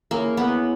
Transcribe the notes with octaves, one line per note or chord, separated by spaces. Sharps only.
G#3 A#3 C#4 E4
B3